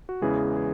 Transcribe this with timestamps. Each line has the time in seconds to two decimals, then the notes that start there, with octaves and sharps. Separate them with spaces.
0.09 F#4
0.22 E2 C#3 E3 G#3 G#4
0.57 G#4